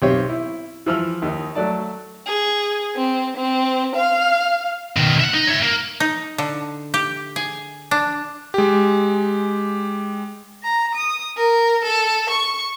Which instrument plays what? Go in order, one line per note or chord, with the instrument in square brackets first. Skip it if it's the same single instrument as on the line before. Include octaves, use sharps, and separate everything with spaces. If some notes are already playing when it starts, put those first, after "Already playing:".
[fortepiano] B1 C4 G4 C#5
E4
E3 F3 E6 F6
D#2 D#4
F#3 A3 D5 A5
[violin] G#4
C4
C4
F5
[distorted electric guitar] B2 D#3
E5 F#5
D#4
C#5 E5
A#3
[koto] D#4
D3
G4
G#4
D4
[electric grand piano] G#3 G4
[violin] A#5
D#6
A#4
A4
C#6